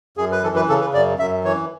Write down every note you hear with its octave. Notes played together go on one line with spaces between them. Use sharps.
F#2 G#4
B4
E3 A4
B4
C#3 A4
B4
F#2 D5
F#2 E5
E3 C#5